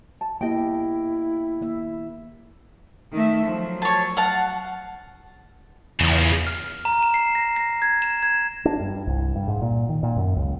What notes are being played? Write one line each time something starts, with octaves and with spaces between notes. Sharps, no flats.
A5
A#3 B3 E4 G4 D#5 G5
D#3 A#3 E5
D#3 A3 E5
F3 F#3
C#5 A5
F5 F#5 A5
E2 C#3 F3
F6
A#5
E7
C7
A#6
A#6
G#6
E7
G#6
D4
G2
C2
G2
G#2
A#2
D#3
A#2
F#2
C#2